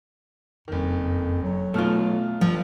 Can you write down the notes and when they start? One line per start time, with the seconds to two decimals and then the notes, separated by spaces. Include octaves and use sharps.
0.68 F#1 F2 D#3
1.43 F#3
1.74 B2 A3 F4 F6 F7
2.41 G1 G2 F3